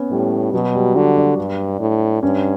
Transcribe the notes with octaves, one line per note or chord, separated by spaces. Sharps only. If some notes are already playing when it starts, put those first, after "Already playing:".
Already playing: B3 C#4
A2 G3
B2 F#3
G3
D3 F#4
D4
G2
A2
G2 C#4